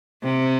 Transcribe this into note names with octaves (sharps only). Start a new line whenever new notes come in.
C3